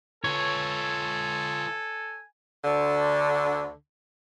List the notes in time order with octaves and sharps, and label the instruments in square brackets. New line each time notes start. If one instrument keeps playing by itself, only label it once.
[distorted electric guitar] F4 B4 [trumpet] A4 [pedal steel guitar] C#5 [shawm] G#5
[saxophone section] D2 D3